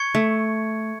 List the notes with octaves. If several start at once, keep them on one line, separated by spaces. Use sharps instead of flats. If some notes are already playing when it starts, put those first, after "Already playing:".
Already playing: C#6 G#6 C#7
A3